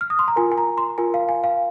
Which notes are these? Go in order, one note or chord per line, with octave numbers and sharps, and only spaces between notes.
F6
D#6
C6
A#5
F4 A#4 G#5
G#5
A#5
C6
F4 A#4 G#5
F5
G#5
F5